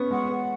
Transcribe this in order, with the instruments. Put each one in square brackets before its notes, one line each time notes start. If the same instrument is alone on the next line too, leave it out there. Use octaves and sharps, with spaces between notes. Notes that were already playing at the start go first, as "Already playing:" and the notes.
Already playing: [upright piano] B3 C#4 [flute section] C#6
[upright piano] G#3 [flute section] F#5
[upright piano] B3